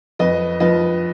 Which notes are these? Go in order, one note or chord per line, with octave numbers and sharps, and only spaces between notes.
F2 B4 D#5
F3 B4 D#5